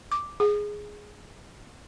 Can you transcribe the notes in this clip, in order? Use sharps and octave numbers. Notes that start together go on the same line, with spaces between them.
D6
G#4